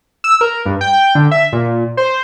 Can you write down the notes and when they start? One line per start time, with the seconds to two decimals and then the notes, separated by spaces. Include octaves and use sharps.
0.24 E6
0.41 A#4
0.66 G2
0.81 G5
1.15 D3
1.31 E5
1.53 A#2
1.97 C5